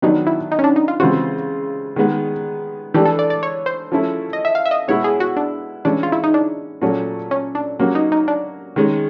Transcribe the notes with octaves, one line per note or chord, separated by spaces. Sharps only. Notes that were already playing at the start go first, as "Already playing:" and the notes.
D#3 F#3 B3 D4 D#4 F#4
E4
D#4
C#4
D4
D#4
F4
C#3 E3 G#3 C4 F4 F#4
D#3 G#3 B3
E3 A3 D4 G4
A4
D5
D5
C#5
C5
F3 A3 C#4 E4
D#5
E5
F5
E5
D#5
B2 G#3 B3 E4 C#5
G#4
F#4
D4
E3 G#3 C#4 D4
F4
E4
D#4
D4
A#2 F#3 A3 C#4
C#4
D4
F#3 A#3 C#4 F#4
D#4
D#4
D4
D#3 G#3 C#4